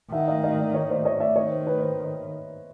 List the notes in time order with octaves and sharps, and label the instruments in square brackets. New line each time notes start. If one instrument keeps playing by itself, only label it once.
[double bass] D#3 [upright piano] E5 F#5
[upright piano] D#5 F5
D#5 F5
D5 E5
C#5 D#5
C5 D5
C#5 D#5
D5 E5
[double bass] D#3 [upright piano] C#5 D#5
[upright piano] C5
B4 C#5
C5